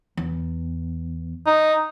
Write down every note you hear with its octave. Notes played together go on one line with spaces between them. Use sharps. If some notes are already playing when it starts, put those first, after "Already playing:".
E2
D#4